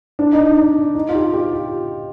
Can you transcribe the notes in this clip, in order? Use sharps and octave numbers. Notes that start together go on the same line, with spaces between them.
D4
D#4
D4
D#4
D#4
F4
G4
G4
F4